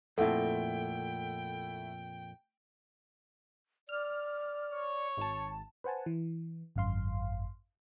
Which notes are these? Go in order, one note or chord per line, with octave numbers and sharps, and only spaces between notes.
F2 A#2 A3 E4 A4 F#5 G5
D5 F6
C#5
G#1 A5
B4 C5 F#5 G#5 A5
E3
G#1 F#2 F5 C6